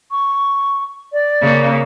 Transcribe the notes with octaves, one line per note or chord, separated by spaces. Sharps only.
C#6
D5
C#3 A#3